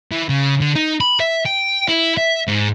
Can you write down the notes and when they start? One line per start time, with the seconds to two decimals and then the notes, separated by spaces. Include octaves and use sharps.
0.12 E3
0.29 C#3
0.61 D3
0.75 D#4
1.00 B5
1.20 E5
1.46 G5
1.88 E4
2.17 E5
2.48 G#2